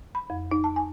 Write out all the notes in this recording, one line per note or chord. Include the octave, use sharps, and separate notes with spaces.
B5
F2
D#4
A5
G#5